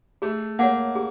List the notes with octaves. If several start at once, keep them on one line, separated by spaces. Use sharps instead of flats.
A3 G#4
A#3 C#5 F#5
G#4